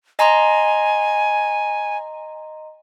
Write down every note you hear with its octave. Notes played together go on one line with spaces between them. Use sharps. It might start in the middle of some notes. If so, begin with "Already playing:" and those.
D#5 G#5 A#5 C6